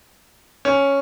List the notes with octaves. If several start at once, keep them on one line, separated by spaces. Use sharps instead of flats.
C#4